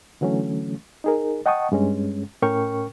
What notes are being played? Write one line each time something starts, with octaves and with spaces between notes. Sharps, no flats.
D3 E3 F#3 A3 C#4
D#4 G#4 A#4
D#5 F#5 G5 A5 C#6 D#6
G2 G#3 C#4
A2 C#4 A#4 G5 C#6 F6